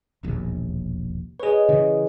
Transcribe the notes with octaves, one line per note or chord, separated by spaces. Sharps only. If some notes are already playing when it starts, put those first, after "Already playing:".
E1 A#1 D#2
G#4 B4 C#5 D#5
C#3 E3